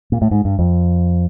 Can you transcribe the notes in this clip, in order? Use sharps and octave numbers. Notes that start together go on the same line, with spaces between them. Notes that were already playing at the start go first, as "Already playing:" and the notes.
A#2
A2
G#2
G2
F2